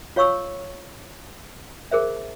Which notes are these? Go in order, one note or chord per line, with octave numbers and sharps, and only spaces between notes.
F4 C#5 F5 C#6 E6
G#4 A#4 C5 E5